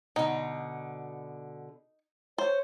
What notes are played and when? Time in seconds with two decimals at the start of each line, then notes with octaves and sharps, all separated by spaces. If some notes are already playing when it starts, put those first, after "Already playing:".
0.16 B2 D3 D#4
2.38 C5 C#5